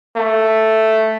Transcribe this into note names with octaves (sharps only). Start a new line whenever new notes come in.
A3